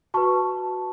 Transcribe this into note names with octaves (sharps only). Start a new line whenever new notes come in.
F#4 B4 A5 C#6